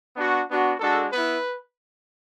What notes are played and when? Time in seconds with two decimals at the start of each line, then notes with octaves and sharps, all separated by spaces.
0.16 B3 D4 F#4
0.48 B3 D4 F#4
0.80 G#3 D4 F#4 A4
1.12 B3 E4 B4